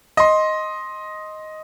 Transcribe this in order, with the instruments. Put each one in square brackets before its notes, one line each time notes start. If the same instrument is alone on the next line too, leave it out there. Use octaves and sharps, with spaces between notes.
[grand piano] D#5 C6